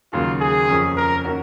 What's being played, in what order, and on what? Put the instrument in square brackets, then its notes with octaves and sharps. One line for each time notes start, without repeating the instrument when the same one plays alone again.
[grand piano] D#2 C#3 F#3 A#3 [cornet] F4
[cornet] G#4
[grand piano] F2 F3 A#3 C#4
[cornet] A#4
[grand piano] D#3 A#3 C#4 F#4 A#4